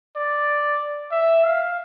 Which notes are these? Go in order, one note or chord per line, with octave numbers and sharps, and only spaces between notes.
D5
E5
F5